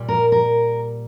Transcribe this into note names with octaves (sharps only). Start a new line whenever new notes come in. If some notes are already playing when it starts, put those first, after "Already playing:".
Already playing: A#2 G3
A#4
A#4